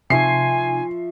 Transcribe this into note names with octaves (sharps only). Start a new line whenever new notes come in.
C3 F3 D#4 E5 G#5 C#6 C7